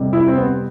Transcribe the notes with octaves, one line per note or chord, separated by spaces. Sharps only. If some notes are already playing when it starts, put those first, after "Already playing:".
Already playing: F2 C3 G3
E4
C4
B3